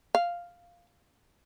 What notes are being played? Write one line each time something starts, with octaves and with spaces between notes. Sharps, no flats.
F5